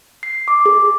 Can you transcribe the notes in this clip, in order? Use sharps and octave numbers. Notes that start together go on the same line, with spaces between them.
C7
D6
G#4